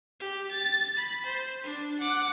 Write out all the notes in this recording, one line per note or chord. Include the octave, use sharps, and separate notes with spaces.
G4
A6
B5
C5
D4
F#5 D6